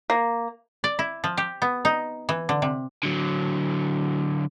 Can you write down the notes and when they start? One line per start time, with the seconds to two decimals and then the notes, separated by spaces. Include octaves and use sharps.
0.10 A#3
0.84 D5
0.99 E4
1.24 F3
1.37 G4
1.62 B3
1.85 D#4
2.29 E3
2.49 D3
2.62 C3
3.03 D3 F#3